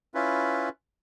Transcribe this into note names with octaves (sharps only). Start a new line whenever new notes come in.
C#4 E4 F4 B4